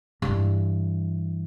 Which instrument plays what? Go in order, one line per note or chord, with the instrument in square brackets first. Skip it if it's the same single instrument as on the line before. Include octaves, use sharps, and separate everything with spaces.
[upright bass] G2 E3